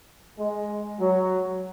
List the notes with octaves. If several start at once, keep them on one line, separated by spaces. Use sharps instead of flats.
G#3
F#3